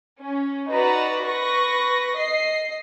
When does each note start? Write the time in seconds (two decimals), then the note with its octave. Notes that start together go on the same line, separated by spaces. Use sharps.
0.21 C#4
0.70 D#4 F#4 B4 D5 A#5 B5
1.25 B4 C#6 A#6
2.16 D#5 C7